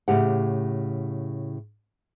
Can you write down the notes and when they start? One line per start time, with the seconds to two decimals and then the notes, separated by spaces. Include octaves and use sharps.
0.08 A2 C#3 G4 F#5